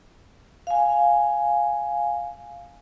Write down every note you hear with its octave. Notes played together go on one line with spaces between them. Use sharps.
F5 G#5